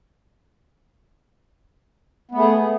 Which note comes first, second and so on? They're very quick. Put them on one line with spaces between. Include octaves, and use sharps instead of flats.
B3 A3 G#4